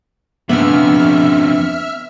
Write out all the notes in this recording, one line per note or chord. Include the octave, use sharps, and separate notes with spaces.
F2 C#3 B3 D4 E5 E6 F6